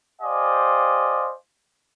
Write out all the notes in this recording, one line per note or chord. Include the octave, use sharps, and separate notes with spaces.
G4 C5 D5 D#5 F5 G#5